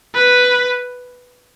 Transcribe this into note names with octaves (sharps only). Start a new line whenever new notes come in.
B4